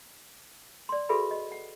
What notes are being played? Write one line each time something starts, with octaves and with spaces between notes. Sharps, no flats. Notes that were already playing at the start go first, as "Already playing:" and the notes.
D5 C6
F#4 G#4 A4 B4 E5 B5
D#5
F#5